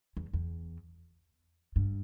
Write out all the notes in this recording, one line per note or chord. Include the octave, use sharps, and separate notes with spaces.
E2
E2
G2